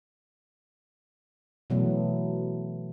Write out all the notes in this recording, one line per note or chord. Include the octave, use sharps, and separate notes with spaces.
B2 E3 F#3 A3 B3